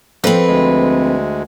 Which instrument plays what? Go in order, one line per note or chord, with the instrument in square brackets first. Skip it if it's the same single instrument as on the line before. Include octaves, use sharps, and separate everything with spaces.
[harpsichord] F2 [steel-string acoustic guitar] C4 B4
[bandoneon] D2 G#3